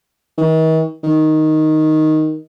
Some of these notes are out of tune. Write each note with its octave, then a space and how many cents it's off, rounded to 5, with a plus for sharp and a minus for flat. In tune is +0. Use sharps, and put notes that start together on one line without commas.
D#3 +45
D#3 +0